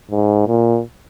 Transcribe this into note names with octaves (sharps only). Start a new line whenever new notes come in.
G#2
A#2